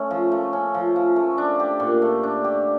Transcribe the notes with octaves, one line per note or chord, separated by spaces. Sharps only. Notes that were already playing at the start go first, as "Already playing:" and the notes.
Already playing: A3 C#4
F3
A3
C#4
F3
F3
A3
D4
G4
A#2
A3
D4
G4